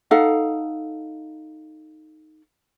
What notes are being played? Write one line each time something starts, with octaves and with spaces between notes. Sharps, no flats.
D#4 A4 F5 F#5